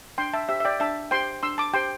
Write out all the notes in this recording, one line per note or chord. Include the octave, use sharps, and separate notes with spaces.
D4 G5 C6
E5 A5
G4 C5 E5
E5
D5 G5
D4 E5 A5
G4 C5 G5 C6
D4 C6 E6
A5 D6
G4 C5 G5 C6